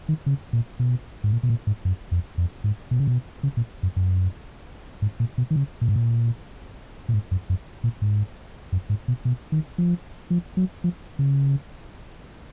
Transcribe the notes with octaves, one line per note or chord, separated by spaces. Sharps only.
D#3
C#3
A#2
B2
G#2
A#2
B2
A#2
G#2
F#2
F2
F2
G#2
B2
C#3
B2
C#3
A#2
F#2
F#2
G#2
A#2
B2
D#3
C#3
A#2
G#2
A#2
A#2
G#2
F#2
F#2
A#2
G#2
F#2
G#2
B2
B2
D#3
F3
F3
F#3
F3
C#3